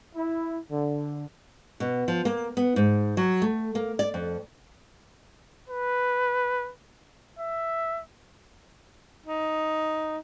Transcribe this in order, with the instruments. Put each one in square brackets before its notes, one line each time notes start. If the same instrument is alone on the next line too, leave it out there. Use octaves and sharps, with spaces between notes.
[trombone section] E4
D3
[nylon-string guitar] B2
F3
A#3
B3
G#2
F#3
A3
A#3
D5
F2
[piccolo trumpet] B4
E5
[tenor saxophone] D#4